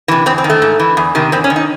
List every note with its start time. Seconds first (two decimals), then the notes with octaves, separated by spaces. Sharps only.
0.08 C3 E3
0.26 E2 C4
0.38 C4
0.44 D#3
0.50 A3
0.62 G#2
0.80 E3
0.97 E2
1.15 C3 D#3
1.32 E2 C4
1.44 C#4
1.50 D#3
1.56 D#4